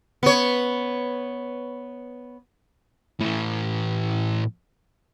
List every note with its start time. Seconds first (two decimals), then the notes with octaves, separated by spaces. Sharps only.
0.23 B3 C#5
3.20 A2 E3